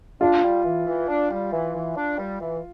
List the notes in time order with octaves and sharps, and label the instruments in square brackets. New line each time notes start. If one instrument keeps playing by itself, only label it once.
[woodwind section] D4 [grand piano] F4
[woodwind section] G3
E3
E3
D4
G3
E3
E3
D4
G3
E3